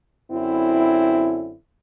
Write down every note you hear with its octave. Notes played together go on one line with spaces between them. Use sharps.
F#2 D3 C4 E4